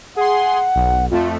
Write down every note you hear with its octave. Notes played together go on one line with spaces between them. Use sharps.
G#4 F#5 C6
B1
F2 A3 F4